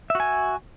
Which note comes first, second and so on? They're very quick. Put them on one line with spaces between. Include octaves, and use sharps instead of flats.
E5 F#4 G#5